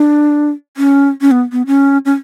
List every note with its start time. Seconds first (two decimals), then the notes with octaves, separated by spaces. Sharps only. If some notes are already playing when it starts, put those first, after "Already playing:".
Already playing: D4
0.77 C#4
1.21 C#4
1.31 B3
1.52 B3
1.67 C#4
2.05 C#4